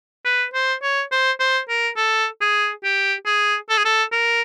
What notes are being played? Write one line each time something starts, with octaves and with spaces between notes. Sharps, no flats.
B4
C5
C#5
C5
C5
A#4
A4
G#4
G4
G#4
A4
G#4
A4
A#4